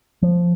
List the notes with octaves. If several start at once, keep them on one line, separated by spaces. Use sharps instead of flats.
F3